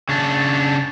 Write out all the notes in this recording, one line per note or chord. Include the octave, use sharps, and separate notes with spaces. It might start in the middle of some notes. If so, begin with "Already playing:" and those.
C#3 D4